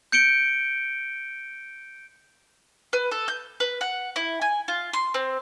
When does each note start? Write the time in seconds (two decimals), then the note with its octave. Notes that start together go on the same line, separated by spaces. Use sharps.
0.12 G6 C#7 D7 G7
2.93 B4
3.11 A4
3.28 G6
3.60 B4
3.81 F#5
4.16 E4
4.41 G#5
4.68 F4
4.93 C6
5.14 C4